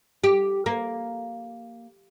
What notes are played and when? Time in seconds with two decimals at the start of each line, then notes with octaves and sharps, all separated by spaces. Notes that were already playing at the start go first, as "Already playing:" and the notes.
0.24 G4
0.66 A#3